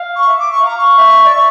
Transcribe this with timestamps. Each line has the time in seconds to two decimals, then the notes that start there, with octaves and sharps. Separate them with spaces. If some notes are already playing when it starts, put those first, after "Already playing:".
Already playing: F5
0.15 C#6
0.27 E5
0.39 D6
0.51 C#6
0.62 F5 A#5
0.77 C#6
0.97 E5
1.25 D5
1.34 E5